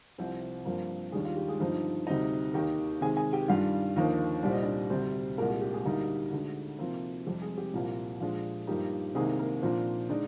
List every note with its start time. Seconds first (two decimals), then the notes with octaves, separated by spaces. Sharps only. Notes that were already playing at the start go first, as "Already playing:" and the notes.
0.18 C2 C3 F3 C4 C5
0.65 G2 F3 A#3 C4 A#4
1.12 D#2 D#3 G3 G#3 D4 G#4
1.25 F4
1.37 G4
1.48 G#3 G#4
1.60 G2 D3 F3 C4 D#4
2.07 D2 C3 G3 C4 D#4 D#5
2.54 D#2 D#3 A#3 D#4 G4 G5
3.01 C3 D#3 G#3 G#4 G#5
3.17 G#4 G#5
3.33 G4 G5
3.48 G2 D#3 G3 D4 F4 F5
3.96 D#2 D3 F3 A#3 D#4
4.43 C2 A#2 G3 C4 D5
4.53 D#5
4.63 D4 D5
4.90 D2 C3 G3 C4 C5
5.38 C2 A#2 G#3 A#3 A#4
5.50 G4
5.62 G4
5.73 G#3 G#4
5.85 D2 D3 G3 A#3 D#4
6.32 D2 D3 G#3 D4
6.79 C3 F3 A#3 C4 C5
7.26 F2 C3 G3 G4
7.42 G#3 G#4
7.58 G4
7.73 C2 A#2 F3 A#3
8.20 A#2 F3 G#3 D4 F4
8.67 G2 F3 A#3 D#4 G4
9.15 C2 C3 D#3 G#3 A#3 D#4 G#4
9.39 A#3 A#4
9.62 A#2 F3 A#3 C4 D4 C5
10.09 D3 G#3 D4 D#4 D5